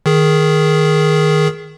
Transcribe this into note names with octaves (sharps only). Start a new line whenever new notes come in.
D#3 G#4